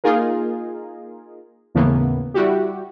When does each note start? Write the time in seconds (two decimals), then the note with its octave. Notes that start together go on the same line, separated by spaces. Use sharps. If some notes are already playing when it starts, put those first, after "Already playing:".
0.04 A#3 D#4 F4 G#4 A#4
1.75 D#2 A2 C#3 E3 A#3 B3
2.34 G3 E4 F#4 G4